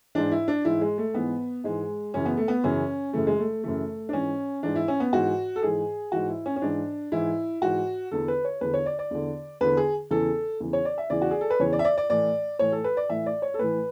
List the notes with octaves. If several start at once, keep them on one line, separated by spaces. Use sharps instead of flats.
G#2 E3 D4
E4
D4
G#2 E3 E4
G#3
A3
G#2 E3 B3
G#2 E3 G#3
F#2 C#3 E3 C#4
B3
A3
B3
F#2 C#3 E3 C#4
F#2 C#3 E3 A3
G#3
A3
F#2 C#3 E3 A3
D4
G#2 E3 C#4
G#2 E3 D4
E4
C#4
B3
G#2 E3 F#4
A4
G#2 E3 G#4
G#2 E3 F#4
E4
C#4
C#4
G#2 E3 D4
G#2 E3 E4
G#2 E3 F#4
E2 D3 A4
B4
C#5
E2 D3 B4
C#5
D5
D5
E2 D3
E2 D3 B4
G#4
E2 C#3 E3 A4
E2 C#3 E3
C#5
D5
E5
E2 C#3 E3 D5
F#4
G#4
A4
B4
E2 C#3 E3 C#5
D5
E5
D5
D5
A2 E3 D5
A2 E3 C#5
A4
B4
D5
A2 E3 E5
D5
C#5
A4
A2 E3 B4